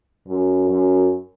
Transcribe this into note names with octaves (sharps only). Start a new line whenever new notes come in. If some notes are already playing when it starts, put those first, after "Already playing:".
F#2
F#2